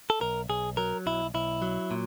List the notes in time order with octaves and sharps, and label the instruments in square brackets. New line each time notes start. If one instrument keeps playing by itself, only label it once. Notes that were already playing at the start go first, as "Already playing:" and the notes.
[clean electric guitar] A4
B1 A#4
B1 G#4
F#3 A#4
B1 E4
B1 E4
F#3
A#2